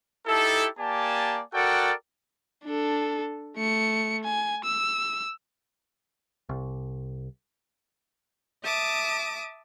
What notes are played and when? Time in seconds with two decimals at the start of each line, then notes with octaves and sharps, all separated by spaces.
0.27 D#4 E4 G4 A4
0.79 A#3 G4 D5 G#5 A5
1.54 F#4 A4 A#4 D5 F#5 G5
2.65 D4 A4
3.57 A3 C#7
4.24 G#5
4.64 E6
6.49 C2
8.63 E5 A5 D6 D#6